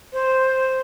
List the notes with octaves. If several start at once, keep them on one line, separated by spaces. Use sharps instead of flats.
C5